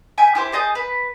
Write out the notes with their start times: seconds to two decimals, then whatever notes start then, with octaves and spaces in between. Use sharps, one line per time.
0.18 E5 G5 G#5
0.35 E4 G4 C5
0.53 G#4 D#5 A5 G6
0.75 B4